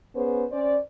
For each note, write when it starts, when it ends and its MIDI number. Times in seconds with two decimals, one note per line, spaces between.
0.15 0.44 59
0.15 0.44 61
0.15 0.44 68
0.15 0.44 71
0.15 0.44 72
0.52 0.78 61
0.52 0.78 72
0.52 0.78 74